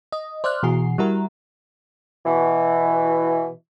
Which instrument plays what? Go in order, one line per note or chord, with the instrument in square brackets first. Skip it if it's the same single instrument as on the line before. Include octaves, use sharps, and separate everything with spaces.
[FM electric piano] D#5
C5 D5 E5 F6 F#6
B2 E3 F#4 G#4 C7
G3 E4 F#4 A#4
[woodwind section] B2 E3